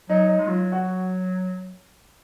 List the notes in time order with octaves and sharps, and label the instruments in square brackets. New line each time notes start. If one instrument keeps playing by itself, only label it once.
[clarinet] F#3 [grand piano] D#4
[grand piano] D#4
[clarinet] G#3
[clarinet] F#3 [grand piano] F4
[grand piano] F#4